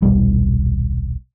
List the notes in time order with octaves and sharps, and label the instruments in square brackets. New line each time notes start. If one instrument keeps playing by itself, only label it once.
[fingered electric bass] D#1 B1 G3